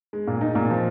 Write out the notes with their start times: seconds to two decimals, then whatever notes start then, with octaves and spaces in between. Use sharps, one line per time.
0.13 G#3
0.27 A#2
0.41 D#4
0.55 A#2
0.70 F3